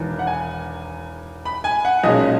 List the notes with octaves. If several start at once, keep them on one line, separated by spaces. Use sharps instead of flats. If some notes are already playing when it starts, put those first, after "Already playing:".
Already playing: E1 E2 D#3
F#5
G#5
B5
G#5
F#5
B1 A#2 G#3 C#4 D#5